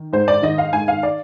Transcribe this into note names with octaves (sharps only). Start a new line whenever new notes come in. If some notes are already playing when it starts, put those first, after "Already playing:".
Already playing: D#3
G#2 C5
D5
D#3 D#5
F5
G#2 G#5
F5
D5